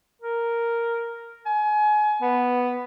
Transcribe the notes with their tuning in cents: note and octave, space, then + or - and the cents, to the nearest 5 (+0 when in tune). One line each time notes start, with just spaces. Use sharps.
A#4 +0
G#5 +30
B3 +0